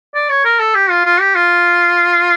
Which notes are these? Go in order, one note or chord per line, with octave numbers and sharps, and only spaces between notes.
D5
C#5
A#4
A4
G4
F4
F4
G4
F4